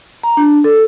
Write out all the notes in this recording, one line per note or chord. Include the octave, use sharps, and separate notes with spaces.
A#5
D4
A4